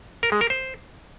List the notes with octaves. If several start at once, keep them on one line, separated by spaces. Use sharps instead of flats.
A#4
G#3
A#4
C5